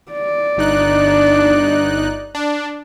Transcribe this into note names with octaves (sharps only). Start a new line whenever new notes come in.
D5
G1 D4 D#4 F#6
D4